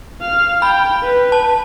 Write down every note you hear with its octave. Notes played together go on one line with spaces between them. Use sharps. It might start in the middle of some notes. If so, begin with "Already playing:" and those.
F5 F6
G5 B5
B4
A5